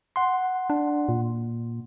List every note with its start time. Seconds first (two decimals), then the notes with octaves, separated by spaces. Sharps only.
0.16 F#5 C6
0.70 D4
1.09 A#2